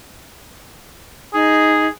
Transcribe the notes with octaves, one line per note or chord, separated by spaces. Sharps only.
D#4 G#4